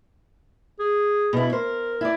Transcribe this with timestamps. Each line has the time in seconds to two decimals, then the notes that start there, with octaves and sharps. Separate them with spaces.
0.79 G#4
1.33 B2 E4
1.52 A#4 C5
2.01 E4 D5